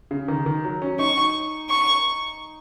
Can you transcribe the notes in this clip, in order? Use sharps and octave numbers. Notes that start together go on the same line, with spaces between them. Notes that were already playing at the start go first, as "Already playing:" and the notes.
C#3
D#3
D#3
F#3
C#4
D#4 C#6
C#6